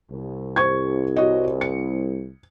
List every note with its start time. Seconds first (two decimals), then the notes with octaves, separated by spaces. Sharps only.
0.11 C2
0.56 C5 C#6 G#6
1.16 F#4 C#5 D#5
1.61 C#7